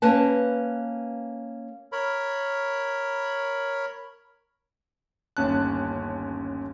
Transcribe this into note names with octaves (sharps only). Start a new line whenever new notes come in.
A#3 C#4 B4 A5
A#4 C#5 B5
G1 D#2 C#4 A5 F#6